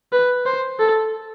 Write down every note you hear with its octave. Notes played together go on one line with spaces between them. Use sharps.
B4
C5
A4